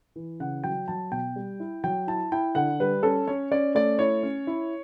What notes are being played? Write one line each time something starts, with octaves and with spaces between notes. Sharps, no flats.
E3
C#3 F#5
F#3 G5
F#3 A5
B2 G5
G3
E4
F#3 G5
E4 A5
E4 G5
D3 F#5
G3 B4
C#4 A4
C#4 C#5
C#4 D5
A3 D5
E4 C#5
C#4
E4